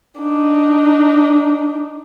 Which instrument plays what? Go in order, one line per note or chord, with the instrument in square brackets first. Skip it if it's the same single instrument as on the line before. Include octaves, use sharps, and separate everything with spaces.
[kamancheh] D4 D#4